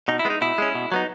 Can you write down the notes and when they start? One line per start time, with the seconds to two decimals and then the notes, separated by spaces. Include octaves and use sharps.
0.08 B2 D#4
0.19 E4
0.25 G#3 B3
0.30 D#4
0.41 B2 E4
0.58 G#3 C#4
0.75 B2
0.92 F#3 B3 D#4